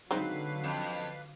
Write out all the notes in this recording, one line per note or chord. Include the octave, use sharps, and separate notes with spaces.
D3 F#3 G#3 C4 D#4 B4 F5
F2